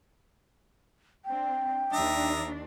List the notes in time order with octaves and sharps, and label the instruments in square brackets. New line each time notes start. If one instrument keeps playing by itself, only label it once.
[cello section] C4 D4 [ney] G5
[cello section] D#2 D4 [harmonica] E5 A#5 D#6